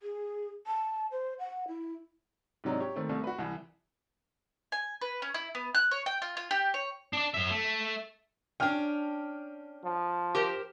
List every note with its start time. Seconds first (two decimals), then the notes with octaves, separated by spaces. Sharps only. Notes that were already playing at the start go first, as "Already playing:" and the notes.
0.03 G#4
0.67 A5
1.12 C5
1.39 F#5
1.68 E4
2.64 G#2 C3 F#3 D4 D#4
2.81 G4 C#5
2.96 D#3 A3 C4
3.09 C2 C3 A3
3.24 F#4 B4
3.38 C2 E3
4.72 G#5
5.02 B4
5.22 C#4
5.34 E4
5.55 B3
5.75 F#6
5.91 C#5
6.06 G5
6.22 F4
6.37 F4
6.51 G4
6.74 C#5
7.13 D4 D5
7.34 F#2 E5
7.50 A3
8.60 C#4 D4 G5 F6
9.84 F3
10.35 G4 A#4 C5